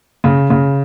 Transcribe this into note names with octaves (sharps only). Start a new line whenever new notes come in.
C#3
C#3